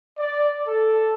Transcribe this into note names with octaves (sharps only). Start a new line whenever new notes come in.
D5
A4